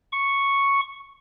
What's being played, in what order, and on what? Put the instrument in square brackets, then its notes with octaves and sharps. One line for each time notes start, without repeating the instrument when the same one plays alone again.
[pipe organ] C#6